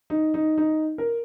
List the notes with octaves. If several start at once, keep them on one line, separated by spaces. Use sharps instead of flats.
D#4
D#4
D#4
A#4